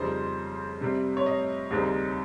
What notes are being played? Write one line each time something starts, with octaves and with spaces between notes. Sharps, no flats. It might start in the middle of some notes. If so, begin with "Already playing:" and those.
Already playing: F2 C#3 G3 C4 D#4 C5
C3 G3 C4
C#5
D#5
D#2 C#3 G3 C4 D#4